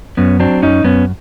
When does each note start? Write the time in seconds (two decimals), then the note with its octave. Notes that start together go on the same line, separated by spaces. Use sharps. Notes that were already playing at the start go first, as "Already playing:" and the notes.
0.17 F#2 B3 C#4
0.40 F#3 C4 D4
0.62 F#2 C#4 D#4
0.84 F#2 B3 C#4